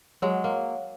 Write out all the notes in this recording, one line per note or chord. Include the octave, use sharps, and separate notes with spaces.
F#3 G#3
A#3